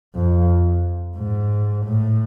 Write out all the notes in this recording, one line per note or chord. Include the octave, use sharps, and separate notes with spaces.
F2
G#2
A2